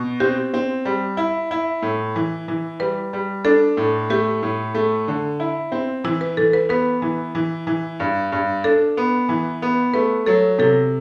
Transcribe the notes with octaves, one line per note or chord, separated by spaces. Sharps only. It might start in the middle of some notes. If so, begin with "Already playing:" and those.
Already playing: B2
C4 G4
C4
G3
E4
E4
A2
E3
E3
G3 B4
G3
D4 A4
A2
A3 G4
A2
A3
D3
E4
C4
E3 E4
B4
E3 A4
B4
B3 B4
E3
E3
E3
G2
G2
D4 A4
B3
E3
B3
A3 B4
F#3 A4
C3 A4